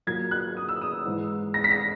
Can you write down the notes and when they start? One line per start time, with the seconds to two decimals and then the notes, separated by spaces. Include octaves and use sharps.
0.07 A#2 F#3 A#3 G#6
0.31 F#6
0.57 D#6
0.69 E6
0.82 D#6
1.06 G#2 E3 G#3
1.54 A#6
1.64 B6
1.71 A#6